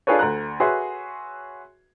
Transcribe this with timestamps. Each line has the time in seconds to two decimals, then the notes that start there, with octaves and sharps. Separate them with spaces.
0.07 D4 F4 G#4 A4 B4 C#5
0.19 D2 A#5 F#6
0.60 F#4 G#4 B4 C#5 E5 C6